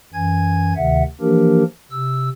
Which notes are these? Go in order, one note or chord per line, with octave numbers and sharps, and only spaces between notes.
F#2 E3 G#5 G#6
D2 C3 D#3 E5 F#5
E3 F3 A#3 D4 G4 A#4
C3 E6